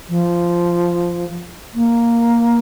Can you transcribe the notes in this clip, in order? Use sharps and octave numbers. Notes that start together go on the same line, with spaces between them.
F3
A#3